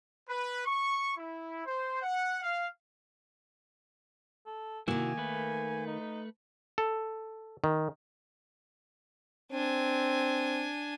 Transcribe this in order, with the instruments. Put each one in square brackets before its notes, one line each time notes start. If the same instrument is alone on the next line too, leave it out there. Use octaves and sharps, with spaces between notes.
[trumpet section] B4
C#6
E4
C5
F#5
F5
[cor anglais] A4
[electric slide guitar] C3 E4 F#4 [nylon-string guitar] D#3 A#3 [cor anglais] G#5
[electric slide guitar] A3 B4
[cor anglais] D#4
[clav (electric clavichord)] A4
D#3
[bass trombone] C4 [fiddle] D4 G#5